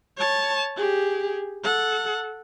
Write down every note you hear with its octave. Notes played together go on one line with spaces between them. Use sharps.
C#5 A5
G4 G#4
A4 F#5